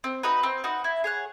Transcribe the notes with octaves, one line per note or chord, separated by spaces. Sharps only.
C4
D#4 F#4 B4
C4
D#4 F#4 B4
E4
G#4 C#5 F#5